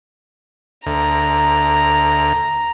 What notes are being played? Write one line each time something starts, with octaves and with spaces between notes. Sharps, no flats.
D2 A#5